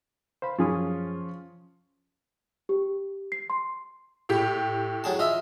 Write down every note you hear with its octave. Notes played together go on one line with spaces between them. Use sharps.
C5 F5 B5
F#2 F3 C#4 F4 G#4 D#6
G4
C7
C6
A2 G4
F#3 G#4 A5
F4 D#5 E5